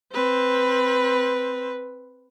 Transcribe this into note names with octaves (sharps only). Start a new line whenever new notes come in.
C4 B4